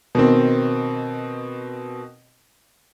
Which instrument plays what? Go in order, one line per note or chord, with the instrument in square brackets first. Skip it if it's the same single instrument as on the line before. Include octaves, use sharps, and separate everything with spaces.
[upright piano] B2 D#3 C4